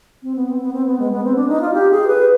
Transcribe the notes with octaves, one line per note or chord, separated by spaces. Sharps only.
C4
B3
C4
B3
C4
B3
G#3
B3
C4
D4
D#4
F4
G4
G#4
B4